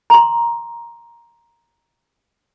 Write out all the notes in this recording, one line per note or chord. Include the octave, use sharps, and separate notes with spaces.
A#5 C6